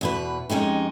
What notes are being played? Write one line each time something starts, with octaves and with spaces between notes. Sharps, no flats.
E2 B2 B4
F2 G#3 C#4 D#4 G4